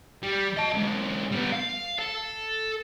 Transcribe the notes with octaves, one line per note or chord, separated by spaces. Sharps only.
G3
D#5 A5
B1 G#3
G3 B3
F5
A4